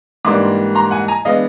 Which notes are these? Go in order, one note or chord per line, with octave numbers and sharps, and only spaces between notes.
G#2 E3 G3 A#3 D4 C6 D6
A#5 C6
F#5 G#5
G#5 A#5
E3 G#3 B3 D4 D#5 F5